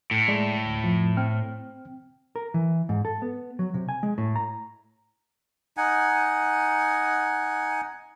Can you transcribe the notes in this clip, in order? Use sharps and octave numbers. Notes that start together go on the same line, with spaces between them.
A2
G#3 D5
D2
F2 F3
C4 G5 F6
A#4
E3
G#2
A4
B3
F#3
C3
G#5
G#3
A2
A#5
D#4 F#5 G#5